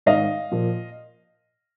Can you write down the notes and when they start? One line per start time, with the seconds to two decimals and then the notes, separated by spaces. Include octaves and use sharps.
0.06 G#2 D#3 D#5 F5
0.51 A#2 F3